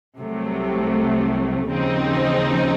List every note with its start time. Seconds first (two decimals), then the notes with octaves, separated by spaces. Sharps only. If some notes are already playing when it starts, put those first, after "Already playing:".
0.17 C2 C3 F#3 A3
1.69 D#2 C#3 F3 C4 D#4